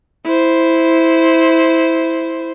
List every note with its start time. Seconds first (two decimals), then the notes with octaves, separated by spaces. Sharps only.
0.25 E4 C5